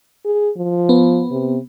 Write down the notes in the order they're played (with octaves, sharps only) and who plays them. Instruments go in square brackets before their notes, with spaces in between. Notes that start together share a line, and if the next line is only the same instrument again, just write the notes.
[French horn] G#4
F3
[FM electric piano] B3
[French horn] C3